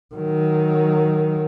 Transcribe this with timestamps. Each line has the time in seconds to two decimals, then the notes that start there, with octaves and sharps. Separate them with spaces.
0.15 D#3 F#3